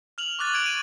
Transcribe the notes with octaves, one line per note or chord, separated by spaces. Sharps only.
F6 F7 F#7
C#6 D6 F#6 A6
G#6 D7 F7
D#7